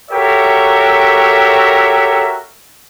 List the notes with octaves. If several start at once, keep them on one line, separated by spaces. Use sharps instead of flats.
F#4 G4 A4 A#4 C#5 E5